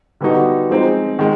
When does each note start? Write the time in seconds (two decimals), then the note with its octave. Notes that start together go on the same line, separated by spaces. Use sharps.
0.21 D3 G3 B3 D#4 F#4
0.70 F3 G#3 C4 D#4
1.19 D#3 G#3